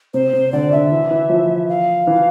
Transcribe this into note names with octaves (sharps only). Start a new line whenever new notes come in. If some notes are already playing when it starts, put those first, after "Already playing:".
C3 C5
C3
D3 D5
D3 E5
E3
E3
F3
F5
E3